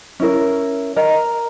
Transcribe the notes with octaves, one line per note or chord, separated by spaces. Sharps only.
C#4 E4 A#4
A#4 D#5 A#5